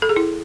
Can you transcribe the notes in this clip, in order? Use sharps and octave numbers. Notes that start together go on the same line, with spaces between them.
A4
G#4
E4